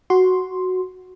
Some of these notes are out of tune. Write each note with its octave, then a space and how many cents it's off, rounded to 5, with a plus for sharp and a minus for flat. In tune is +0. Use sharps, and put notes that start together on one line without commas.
F#4 +0 C6 +0